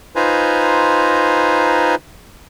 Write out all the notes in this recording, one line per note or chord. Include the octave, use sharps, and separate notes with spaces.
D#4 F4 B4 C5 G#5 A#5